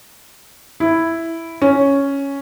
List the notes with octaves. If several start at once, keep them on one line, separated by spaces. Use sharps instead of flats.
E4
C#4